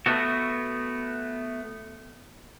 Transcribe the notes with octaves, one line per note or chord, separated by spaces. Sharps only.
A3 B3 F#4